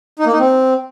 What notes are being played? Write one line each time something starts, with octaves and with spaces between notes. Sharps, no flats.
D#4
A#3
D#4
C4